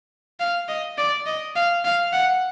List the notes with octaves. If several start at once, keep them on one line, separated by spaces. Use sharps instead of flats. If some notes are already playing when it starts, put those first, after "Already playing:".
F5
D#5
D5
D#5
F5
F5
F#5